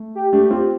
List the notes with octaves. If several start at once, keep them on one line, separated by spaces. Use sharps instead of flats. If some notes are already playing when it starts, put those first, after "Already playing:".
Already playing: A3
G4
A3 D4 G4
C4 F4 G4